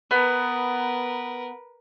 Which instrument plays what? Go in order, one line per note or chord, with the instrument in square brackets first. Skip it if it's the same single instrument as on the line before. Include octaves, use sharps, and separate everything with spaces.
[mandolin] B3 [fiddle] A#4 B4